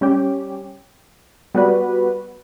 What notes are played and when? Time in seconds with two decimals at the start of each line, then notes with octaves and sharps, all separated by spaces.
0.01 G3 C#4 G4
1.54 G3 B3 F#4 B4 D5